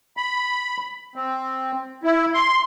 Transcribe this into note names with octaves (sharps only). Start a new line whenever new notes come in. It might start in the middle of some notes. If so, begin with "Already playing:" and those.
B5
C4
E4
C6